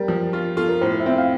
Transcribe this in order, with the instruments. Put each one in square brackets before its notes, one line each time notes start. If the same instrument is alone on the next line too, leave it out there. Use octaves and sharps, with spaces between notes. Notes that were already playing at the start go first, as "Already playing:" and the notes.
Already playing: [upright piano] G3 [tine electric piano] A#4
[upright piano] F3
F4
[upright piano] F4 [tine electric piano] A4
[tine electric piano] A#4
[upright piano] A2 [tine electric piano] C5
[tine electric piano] E5
[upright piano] C4
[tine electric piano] F5